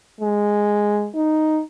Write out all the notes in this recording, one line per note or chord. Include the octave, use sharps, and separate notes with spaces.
G#3
D#4